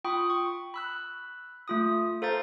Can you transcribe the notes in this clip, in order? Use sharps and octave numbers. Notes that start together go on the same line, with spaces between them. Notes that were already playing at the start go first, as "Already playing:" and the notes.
F4 G5 B5 C#6 D#6
C#6
B5 E6 F#6
A3 F4 D#6
A4 C5 F5 A#5 G6 A6